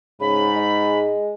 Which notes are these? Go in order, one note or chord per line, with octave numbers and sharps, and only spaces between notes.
G#2 C#3 B5
G#3